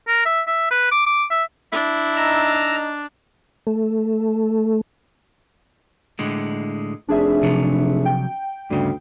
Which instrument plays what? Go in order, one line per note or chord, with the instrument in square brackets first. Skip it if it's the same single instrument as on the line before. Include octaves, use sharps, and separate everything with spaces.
[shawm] A#4
E5
E5
B4
D6
D6
E5
[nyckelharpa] D4 [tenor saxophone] E4
[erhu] D#4 [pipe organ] A#5 E6
[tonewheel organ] A3
[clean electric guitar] A2 D3 G#3
[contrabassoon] F1 [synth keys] D4 G#4 E5
[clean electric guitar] C3 F3 F#3
[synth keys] G5
[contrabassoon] D2 [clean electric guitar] G2 C#3